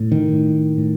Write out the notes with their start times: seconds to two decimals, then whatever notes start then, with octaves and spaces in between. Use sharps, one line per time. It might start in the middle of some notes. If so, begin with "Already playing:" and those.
Already playing: A2
0.12 D#3
0.33 A2
0.78 A2